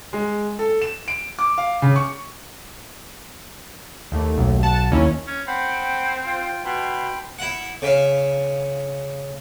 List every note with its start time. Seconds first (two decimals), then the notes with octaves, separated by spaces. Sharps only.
0.13 G#3
0.59 A4
0.82 E7
1.08 D7
1.39 D6
1.58 F5
1.82 C#3
1.96 C#6
4.12 D#2 A3
4.38 B1
4.63 F#5 A5
4.92 D#2 C#4 E4
5.27 C#4
5.48 C4 F#5 G5 B5
6.25 F4 G5
6.65 B2 G5 B5 C6
7.39 E4 F#5
7.82 C#3 E5 F5